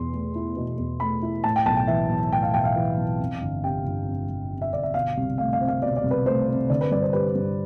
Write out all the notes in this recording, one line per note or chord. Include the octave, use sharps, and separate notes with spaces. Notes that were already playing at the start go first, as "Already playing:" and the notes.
Already playing: E2 B2 C6
A3
E4
B2
E2
A3 B5
E4
A2 A5
G5
B1 A5
G5
E3 E5
B1
A2 G5
F5
B1 G5
F5
E3
B1
F2
G1
C3 G5
G1
F2
G1
C3
E5
G1 D5
E5
B2 F5
C2
A3 F5
F5
C4
F5
B2 D5
D5
C2
B4
A3 C5
C4
D3 D5
B4
G2 D5
C5
G3 B4
G2